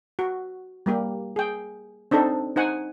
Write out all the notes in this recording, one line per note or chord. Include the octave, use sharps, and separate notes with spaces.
F#4
G3 A#3 G4
G#4 G5
C4 D4 D#4 A4 C5
D#4 C5 F#5 G#5